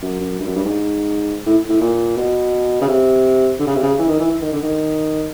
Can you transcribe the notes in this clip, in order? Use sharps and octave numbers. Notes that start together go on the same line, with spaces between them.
F#2
F#2
G2
F#2
G2
G#2
A2
A2
A#2
B2
C#3
C3
D3
C#3
C3
C#3
E3
D#3
E3
E3
D#3
D3
D#3